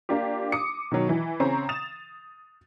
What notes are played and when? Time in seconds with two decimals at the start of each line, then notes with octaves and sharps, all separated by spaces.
0.09 A#3 D4 F4 G4
0.52 D6 D#6 C#7
0.92 B2 D#3 F#3
1.09 E3
1.40 C#3 C4 C#4 A#5 C#6
1.69 D#6 A6 E7 F7